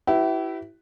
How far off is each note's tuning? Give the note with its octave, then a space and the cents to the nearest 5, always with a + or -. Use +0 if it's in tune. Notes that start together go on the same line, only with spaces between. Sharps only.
E4 +0 G4 -45 B4 +0